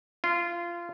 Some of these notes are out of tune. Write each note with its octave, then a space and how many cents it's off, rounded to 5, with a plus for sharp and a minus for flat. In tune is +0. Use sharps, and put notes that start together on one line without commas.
F4 -20